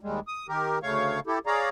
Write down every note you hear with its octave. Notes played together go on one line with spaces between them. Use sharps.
D#2 G3 G#3
D#6
D#3 G4 A#4
D2 C#3 A3 C#5 F5 C#6
E4 G4 A4
G#4 C#5 D5 F5 A#5